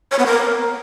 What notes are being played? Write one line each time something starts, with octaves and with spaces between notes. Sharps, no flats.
C#5
B3
A#4